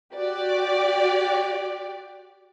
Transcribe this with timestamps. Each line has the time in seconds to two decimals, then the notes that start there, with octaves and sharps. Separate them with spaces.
0.15 F#4 G4 D5